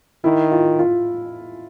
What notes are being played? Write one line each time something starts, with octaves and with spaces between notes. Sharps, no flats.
D#3 E4
F4
F4